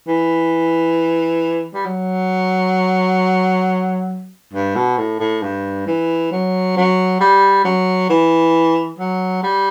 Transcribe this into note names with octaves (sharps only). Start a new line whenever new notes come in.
E3
G3
F#3
G2
B2
A2
A2
G2
E3
F#3
F#3
G3
F#3
E3
F#3
G3